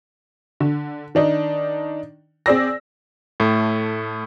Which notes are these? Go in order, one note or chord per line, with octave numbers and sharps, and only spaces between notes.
D3
D#3 D4 D#4
C4 G#4 C5 D5 E6 A#6
A2 A3